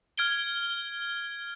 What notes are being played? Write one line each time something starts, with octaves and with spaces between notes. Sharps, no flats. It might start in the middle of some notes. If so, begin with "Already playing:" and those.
F6 G#6 D7 G7